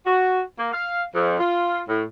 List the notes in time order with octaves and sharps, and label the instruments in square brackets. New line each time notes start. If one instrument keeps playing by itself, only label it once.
[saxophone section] F#4
A#3
F5
F2
F4
A2